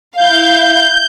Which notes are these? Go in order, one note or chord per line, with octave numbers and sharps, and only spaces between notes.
E4 F5 G6